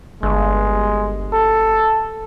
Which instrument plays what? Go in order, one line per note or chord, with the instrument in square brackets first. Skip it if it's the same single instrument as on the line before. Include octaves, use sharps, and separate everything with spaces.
[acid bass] G1 [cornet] G#3
[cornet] A4